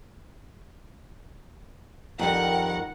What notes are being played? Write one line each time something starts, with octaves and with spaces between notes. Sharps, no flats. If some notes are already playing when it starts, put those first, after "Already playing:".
F2 D#3 G3 A#4 F#5